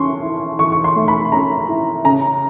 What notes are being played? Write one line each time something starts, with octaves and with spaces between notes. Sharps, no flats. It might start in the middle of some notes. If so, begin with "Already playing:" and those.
Already playing: E3 C#4 C6 C#6
E4
E3 C#6
C#6
C6
A3
B5
C#4 A#5
E4
C#3 A#5